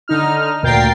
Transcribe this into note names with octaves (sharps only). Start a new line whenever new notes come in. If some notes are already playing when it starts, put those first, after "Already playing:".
D3 D#4 F6
D2 A#2 A#4 G5 A6 C7